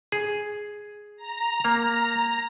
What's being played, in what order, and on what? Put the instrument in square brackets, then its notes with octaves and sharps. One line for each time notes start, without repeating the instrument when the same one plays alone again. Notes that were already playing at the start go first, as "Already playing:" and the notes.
[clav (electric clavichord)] G#4
[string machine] A#5
[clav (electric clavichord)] A#3